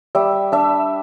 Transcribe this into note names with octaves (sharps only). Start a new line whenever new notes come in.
G3 E5
D4 E5